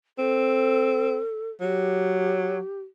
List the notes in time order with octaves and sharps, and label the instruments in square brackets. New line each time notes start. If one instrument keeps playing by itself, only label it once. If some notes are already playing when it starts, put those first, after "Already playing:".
[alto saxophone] C4 [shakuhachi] A4
[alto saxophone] F#3 [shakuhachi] G4